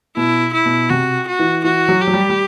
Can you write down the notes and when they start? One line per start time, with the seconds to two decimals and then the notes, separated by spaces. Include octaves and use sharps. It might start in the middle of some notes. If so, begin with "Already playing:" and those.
0.16 B2 E4
0.54 E4
0.65 B2
0.90 C3 F#4
1.28 F#4
1.39 E3
1.64 E3 F#4
1.88 F#3
2.01 G4
2.07 F#3
2.13 G3
2.30 G3